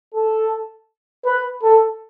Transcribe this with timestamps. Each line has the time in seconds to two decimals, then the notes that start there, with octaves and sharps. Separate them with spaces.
0.15 A4
1.25 B4
1.63 A4